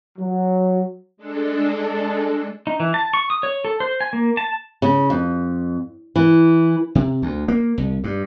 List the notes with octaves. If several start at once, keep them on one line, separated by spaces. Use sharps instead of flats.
F#3
G#3 D4 A4
D#4
E3
A5
C#6
D#6
C#5
A4
C5
G#5
A#3
A5
C#3
F2
E3
C3
D2
A#3
C2
G2